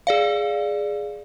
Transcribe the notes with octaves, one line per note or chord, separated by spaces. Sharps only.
G#4 D5 F5